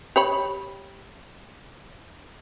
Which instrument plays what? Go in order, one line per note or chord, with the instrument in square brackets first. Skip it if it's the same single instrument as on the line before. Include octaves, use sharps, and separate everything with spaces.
[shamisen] G4 C#5 B5